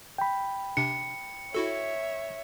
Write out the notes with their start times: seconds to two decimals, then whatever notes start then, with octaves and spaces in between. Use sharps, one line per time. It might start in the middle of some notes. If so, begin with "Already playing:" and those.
0.18 G5 B5
0.77 C3 D4 C#7
1.55 E4 F#4 A4 C#5 E5